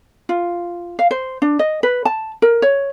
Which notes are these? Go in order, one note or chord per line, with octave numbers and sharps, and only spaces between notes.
F4
F5
C5
D4
D#5
B4
A5
A#4
C#5